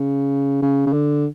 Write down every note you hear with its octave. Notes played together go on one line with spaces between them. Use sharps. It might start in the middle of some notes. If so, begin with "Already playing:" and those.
Already playing: C#3
C#3
C#3
D3